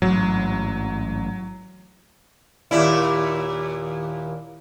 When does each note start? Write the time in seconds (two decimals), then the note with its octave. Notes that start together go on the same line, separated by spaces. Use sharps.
0.02 A1 G#2 F#3
2.71 D#2 A#2 E4